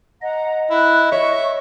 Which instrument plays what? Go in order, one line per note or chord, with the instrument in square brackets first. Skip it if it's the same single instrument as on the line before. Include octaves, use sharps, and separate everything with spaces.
[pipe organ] D#5 [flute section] F#5 A#5
[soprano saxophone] E4 [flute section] F#6
[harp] C#5 [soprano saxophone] E5 [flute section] C#6